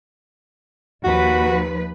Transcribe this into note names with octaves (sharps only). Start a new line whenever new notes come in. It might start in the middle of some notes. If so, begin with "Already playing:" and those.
D#2 F3 F#4 B4